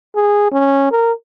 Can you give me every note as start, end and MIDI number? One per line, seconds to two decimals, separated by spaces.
0.15 0.52 68
0.52 0.91 61
0.92 1.12 70